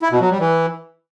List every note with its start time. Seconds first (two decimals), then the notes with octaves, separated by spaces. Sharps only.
0.02 E4
0.12 B2
0.21 F#3
0.30 G3
0.40 E3